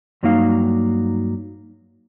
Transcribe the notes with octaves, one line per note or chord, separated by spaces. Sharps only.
G2 F#3 A#3 D#4 F5